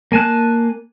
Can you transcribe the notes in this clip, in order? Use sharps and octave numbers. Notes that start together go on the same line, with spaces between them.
A#3 G#5 A5 F#6